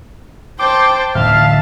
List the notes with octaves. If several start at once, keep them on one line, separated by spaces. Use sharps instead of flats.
C5 G5 A5 D6
D1 A1 D2 E5 F5 A5